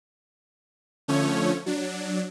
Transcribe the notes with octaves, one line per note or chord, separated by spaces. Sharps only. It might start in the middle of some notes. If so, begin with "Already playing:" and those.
D3 F3 A3 C#4 C#5
F#3 D4